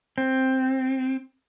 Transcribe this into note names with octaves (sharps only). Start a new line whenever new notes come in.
C4